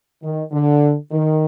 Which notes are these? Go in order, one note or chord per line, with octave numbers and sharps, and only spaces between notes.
D#3
D3
D#3